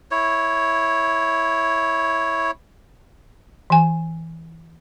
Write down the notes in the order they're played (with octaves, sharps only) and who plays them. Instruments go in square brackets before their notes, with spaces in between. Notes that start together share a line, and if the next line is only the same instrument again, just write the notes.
[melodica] E4 C#5
[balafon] E3 G#5